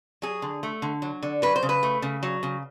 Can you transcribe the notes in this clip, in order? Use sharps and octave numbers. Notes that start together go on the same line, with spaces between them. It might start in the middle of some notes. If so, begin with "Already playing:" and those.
F#3 G#4
D3
A3
D3
F#3
D3
F#3 B4
C5
C#3
B4
A3
C#3
F#3
C#3